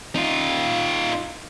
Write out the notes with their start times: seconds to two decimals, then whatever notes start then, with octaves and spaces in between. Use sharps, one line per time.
0.15 D#4 F4